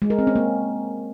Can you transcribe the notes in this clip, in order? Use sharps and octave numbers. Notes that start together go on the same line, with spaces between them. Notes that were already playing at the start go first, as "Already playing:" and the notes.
G#3
A#4
C4
C#4
A#3